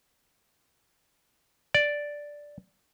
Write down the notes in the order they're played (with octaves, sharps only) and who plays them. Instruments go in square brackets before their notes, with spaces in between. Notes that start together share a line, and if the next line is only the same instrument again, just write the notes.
[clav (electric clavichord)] D5